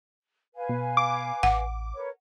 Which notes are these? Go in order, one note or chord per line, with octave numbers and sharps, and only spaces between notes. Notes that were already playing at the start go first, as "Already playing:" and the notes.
B4 F5 G#5
B2
D6
A1 F#5
A#4 B4 C#5